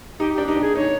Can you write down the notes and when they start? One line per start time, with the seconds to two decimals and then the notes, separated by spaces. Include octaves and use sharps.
0.19 D#4 G4
0.33 D4 G4
0.48 D#4 G4
0.56 D4 G#4
0.75 D#4 C#5